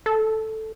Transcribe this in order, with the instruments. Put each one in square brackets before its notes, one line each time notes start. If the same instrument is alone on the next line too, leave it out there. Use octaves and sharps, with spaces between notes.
[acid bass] A4